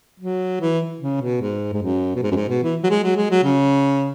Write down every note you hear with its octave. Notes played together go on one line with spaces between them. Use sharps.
F#3
E3
C#3
B2
G#2
G#2
F#2
B2
G#2
F#2
G#2
B2
E3
F#3
G#3
F#3
G#3
F#3
C#3